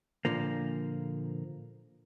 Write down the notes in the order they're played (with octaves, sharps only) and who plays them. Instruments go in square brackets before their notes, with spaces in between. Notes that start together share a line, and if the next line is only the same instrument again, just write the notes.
[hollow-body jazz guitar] A#2 D3 F3 A#3